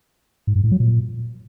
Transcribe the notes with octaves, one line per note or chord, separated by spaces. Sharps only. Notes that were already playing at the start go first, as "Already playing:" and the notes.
G#2
G2
A2
F#3
A#2